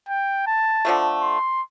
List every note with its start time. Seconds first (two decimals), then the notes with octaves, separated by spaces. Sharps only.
0.09 G5
0.47 A5
0.85 D3 F3 A3
1.22 C6